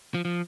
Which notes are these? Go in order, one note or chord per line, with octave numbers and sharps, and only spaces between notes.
F3
F3